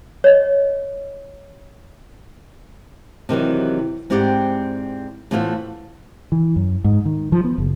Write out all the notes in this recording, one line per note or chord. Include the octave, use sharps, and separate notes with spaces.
C#5 D#5
C3 D#3 E3 F#3
G#2 C4 E4 G4 D5 F#5
A2 E3 B3 F4 C5 E5
E3
F#2
G#2
D#3
F3
B3
F#1